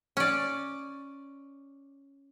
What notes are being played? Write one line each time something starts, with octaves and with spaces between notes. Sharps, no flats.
C#4 D5